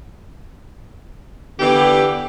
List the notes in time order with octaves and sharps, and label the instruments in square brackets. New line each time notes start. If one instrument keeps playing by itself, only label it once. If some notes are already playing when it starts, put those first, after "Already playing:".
[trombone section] D3 B3 [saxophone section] E3 G4